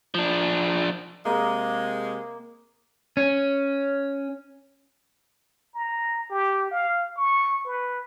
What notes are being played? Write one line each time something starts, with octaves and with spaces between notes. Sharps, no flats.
F3 D4
C3 G#3 A#3
C#4
A#5
G4
F5
C#6
B4